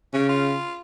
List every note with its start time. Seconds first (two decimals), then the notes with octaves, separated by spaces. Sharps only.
0.14 C#3 C#4
0.29 F4